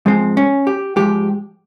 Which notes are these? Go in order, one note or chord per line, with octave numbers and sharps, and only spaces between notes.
G#2 F3 G#3 C4
C#4
G4
G#2 F3 G#3 G4